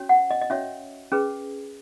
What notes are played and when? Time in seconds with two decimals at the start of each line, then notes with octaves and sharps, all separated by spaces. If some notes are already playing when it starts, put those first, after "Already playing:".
Already playing: C#4 F#4 C#5
0.09 F#5
0.31 D#5
0.41 D#5
0.50 C#4 F#4 C#5 E5
1.12 C#4 G#4 B4